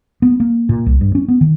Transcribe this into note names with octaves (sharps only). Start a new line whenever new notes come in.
B3
A#3
A#2
C2
G2
C#4
B3
D#3